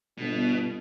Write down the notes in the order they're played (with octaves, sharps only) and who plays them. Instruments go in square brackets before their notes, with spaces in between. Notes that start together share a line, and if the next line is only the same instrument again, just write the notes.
[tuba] G1 [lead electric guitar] B2